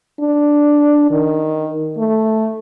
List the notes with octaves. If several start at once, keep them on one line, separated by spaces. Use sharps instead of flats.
D4
D#3
A3